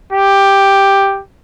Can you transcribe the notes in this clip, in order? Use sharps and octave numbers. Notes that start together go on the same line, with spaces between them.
G4